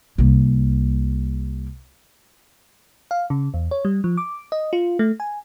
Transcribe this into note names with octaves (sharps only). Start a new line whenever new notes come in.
C2 A#3
F5
C#3
E2
C#5
G3
F3
D6
D#5
F4
A3
G#5